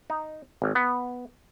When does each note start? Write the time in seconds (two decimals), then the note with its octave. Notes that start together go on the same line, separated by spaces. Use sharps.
0.10 D#4
0.62 G#1
0.75 B3